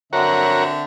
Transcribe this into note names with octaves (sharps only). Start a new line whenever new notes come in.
D3 C4 F#4 A#4 C#5 E5